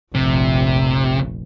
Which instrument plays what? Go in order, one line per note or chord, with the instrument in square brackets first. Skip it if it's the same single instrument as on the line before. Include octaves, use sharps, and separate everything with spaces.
[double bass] F1 A#1 [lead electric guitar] C3